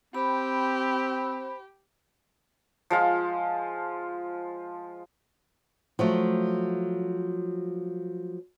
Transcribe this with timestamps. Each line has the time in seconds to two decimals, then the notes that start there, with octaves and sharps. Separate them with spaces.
0.14 C4 G4 C5 B5
2.90 F3 G#3 F4
5.99 F3 F#3 A3